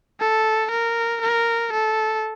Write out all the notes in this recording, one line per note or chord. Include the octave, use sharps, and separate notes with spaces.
A4
A#4
A#4
A4